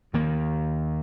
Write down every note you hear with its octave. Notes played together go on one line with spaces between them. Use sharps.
D#2 D#3 A#3